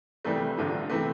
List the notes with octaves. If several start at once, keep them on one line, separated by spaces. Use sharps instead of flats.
F2 C3 E3 G3 A3
A1 G2 D3 F3
C3 E3 A3